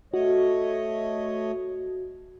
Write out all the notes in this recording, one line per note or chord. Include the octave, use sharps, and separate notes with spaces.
A3 F#4 C#5 D#5